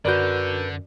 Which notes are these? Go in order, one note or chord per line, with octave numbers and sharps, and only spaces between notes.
F#2 D3 F#4 A#4 B4 D5 G6